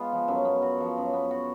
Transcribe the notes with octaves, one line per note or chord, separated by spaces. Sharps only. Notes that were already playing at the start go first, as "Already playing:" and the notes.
Already playing: G#3 B3 F4
F3
F#2
B3
F#4
F3
F#2
B3
F#4